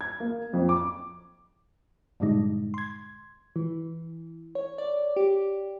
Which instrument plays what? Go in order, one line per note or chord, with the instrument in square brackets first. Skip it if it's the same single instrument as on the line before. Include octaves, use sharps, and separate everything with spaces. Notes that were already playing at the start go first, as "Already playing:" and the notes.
[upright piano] G#6
A#3
F2
D6
[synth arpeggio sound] G2 A#2 D3 G3 G#3 D#4
C6 G#6
[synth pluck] E3
C#5
D5
G4